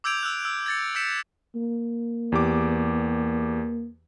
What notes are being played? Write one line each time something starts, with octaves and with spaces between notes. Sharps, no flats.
D6 E6 G6 G#6 D7 F7
E6 F#6
E6
G#6 A6 C#7
E6 G6 B6 C#7 E7
A#3
E2 G4 D6